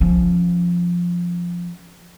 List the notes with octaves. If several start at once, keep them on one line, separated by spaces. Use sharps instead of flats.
F3 C#4